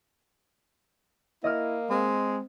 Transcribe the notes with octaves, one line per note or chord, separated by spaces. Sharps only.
A#3 E4 D#5 D#6 F6
G#3 C4